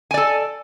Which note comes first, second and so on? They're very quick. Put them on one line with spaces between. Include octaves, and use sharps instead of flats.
G#5 D5 A4